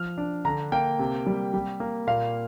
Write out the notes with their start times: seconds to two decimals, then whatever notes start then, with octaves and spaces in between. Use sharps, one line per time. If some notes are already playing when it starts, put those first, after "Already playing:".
Already playing: F3 F6
0.18 D4
0.45 D3 A#5
0.72 A#3 G5
0.99 C3
1.27 G3
1.54 G3
1.80 A#3
2.07 A#2 F5